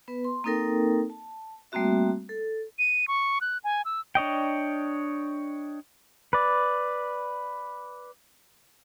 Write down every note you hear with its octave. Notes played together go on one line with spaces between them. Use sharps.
B3 B4
C6
A#3 C4 D#4 A4 A#4 G5
A5
G3 A3 A#3 C4 F#4 E5
A4
D#7
C#6
F#6
G#5
E6
D4 C#5 D#5 G5
B4 D5